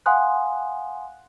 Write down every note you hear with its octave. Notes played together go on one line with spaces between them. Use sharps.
F5 F#5 G#5 C6 D#6 F#6